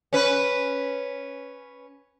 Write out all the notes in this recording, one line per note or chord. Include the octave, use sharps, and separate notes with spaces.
C#4 B4